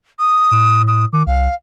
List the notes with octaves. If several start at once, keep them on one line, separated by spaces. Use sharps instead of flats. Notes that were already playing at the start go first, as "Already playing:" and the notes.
D#6
A2
D#6
D#3 D6
C2 F5